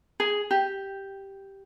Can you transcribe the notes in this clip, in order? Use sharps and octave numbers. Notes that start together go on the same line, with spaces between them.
G#4
G4